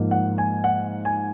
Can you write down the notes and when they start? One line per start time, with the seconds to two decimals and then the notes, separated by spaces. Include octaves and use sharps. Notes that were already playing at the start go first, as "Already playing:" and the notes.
Already playing: G#2 F3 A#3
0.11 F#5
0.38 G#5
0.64 F#5
1.05 G#5